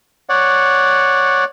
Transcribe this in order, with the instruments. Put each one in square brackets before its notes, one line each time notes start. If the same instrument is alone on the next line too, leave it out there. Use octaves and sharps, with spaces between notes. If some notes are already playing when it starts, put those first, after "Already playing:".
[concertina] C#5 D5 F#5